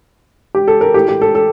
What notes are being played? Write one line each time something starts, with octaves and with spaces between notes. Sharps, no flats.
G4
A4
A#4
A2 A3 G4
G4
A4
A4